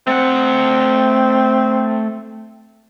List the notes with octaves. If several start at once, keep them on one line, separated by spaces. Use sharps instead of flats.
A3 C4 F#5